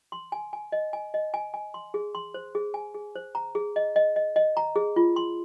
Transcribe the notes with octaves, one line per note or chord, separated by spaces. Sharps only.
C6
G#5
G#5
D#5
G#5
D#5
G#5
G#5
C6
G#4
C6
C5
G#4
G#5
G#4
C5
A#5
G#4
D#5
D#5
D#5
D#5
A#5
G#4
F4
C6